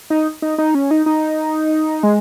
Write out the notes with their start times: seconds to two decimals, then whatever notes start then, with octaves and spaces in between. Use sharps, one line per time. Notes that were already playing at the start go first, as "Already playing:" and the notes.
0.10 D#4
0.42 D#4
0.58 D#4
0.75 C#4
0.91 D#4
1.06 D#4
2.03 G#3